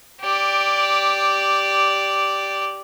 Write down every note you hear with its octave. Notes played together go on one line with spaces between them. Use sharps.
G4 D5